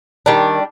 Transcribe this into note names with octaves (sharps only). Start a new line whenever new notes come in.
D#3 G3 D4